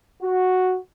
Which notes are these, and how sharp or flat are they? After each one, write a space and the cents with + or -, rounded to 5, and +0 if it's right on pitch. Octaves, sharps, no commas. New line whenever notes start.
F#4 -5